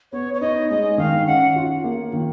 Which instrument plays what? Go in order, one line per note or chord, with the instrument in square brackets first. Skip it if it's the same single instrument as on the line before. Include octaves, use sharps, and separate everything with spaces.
[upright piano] B3 [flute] C#5
[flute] C#5
[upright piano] D#4 [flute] D#5
[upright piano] G#3 [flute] D#5
[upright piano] D#3 [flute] F5
[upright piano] C#4 [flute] F#5
[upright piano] F4
A#3
D#3